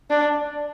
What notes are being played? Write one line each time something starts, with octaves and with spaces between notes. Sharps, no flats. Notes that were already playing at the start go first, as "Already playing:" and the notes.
D4